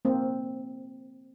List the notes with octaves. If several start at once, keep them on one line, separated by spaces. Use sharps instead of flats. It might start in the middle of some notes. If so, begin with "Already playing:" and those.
A#3 C4